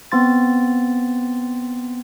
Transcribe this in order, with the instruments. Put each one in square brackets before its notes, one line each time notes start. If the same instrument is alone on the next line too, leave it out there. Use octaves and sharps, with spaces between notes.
[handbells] B3 C4 C6 A6